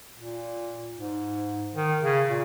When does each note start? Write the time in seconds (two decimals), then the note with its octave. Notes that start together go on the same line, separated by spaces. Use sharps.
0.18 A#2
0.98 G#2
1.76 D#3
2.03 C#3
2.29 A#2